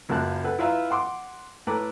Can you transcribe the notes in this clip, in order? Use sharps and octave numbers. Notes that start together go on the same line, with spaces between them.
C#2 F#2 A#3 A5 F#6
A4 B4 F#5
E4 F4 B4 E5 F5 A#5
F#5 C6 D6
A2 A4 B4 A#5 D6